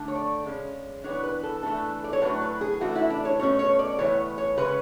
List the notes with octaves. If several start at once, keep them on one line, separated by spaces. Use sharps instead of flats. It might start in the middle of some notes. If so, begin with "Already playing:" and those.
Already playing: D3 A3 D4
C#5
D5
C#3 G#3 C#4
E3 B3 D4 C#5
B4
A4
E3 A3 D4 A4
D5
C#5
A2 F#3 A3 D4 B4
B4
G#4
E3 A3 D4 F#4
E4
D4
C#5
B2 A3 C#4 C#5
C#5
D5
A2 E3 B3 C#5
C#5
C#3 G#3 C#4 B4